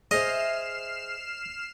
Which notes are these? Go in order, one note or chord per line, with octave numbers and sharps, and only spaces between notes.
G#4 C5 D#5 E5 F6 C7 E7